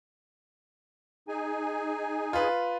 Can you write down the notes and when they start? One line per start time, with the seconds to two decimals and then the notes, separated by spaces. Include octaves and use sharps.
1.28 D#4 G#4 G#5
2.33 F4 B4